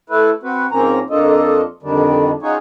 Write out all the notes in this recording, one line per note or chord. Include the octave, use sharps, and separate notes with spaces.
A3 E4 B4
C4 F#4 B4
G#2 F3 A#3 C4 C#4 A#5
F2 A#3 D4 F4 A4 D#5
F2 D3 D#3 G3 D4
C#4 D#4 F4 F#4 G#4 C#5